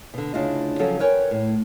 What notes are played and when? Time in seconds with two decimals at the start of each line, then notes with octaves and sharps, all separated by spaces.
0.14 B2 D3
0.34 D2 C#3 D4 E4 F4 D#5
0.79 C#3 F3 F#3 C#4 A4
1.00 A#4 B4 C#5 G5 G#5
1.31 A2